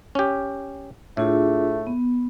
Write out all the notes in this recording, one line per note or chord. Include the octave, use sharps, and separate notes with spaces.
C#4 G4
A2 A3 D4 F4 G#4
B3